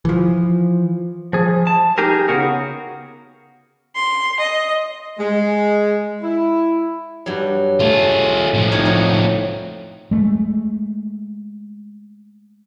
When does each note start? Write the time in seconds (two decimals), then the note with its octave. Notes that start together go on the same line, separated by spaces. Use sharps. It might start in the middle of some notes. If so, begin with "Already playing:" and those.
0.05 E3 F3
1.33 F3 G#4
1.67 A5
1.98 D#4 G4 G#4 A#4
2.28 C#3 B3 F#4 G#4 A#4
3.96 C6
4.41 D#5
5.19 G#3
6.22 E4
7.26 G2 F#3
7.80 A3 F4 G#4
8.54 A2 F3
8.72 C4 D#4 C#5
8.85 D#4 F#4
10.11 G#3 A3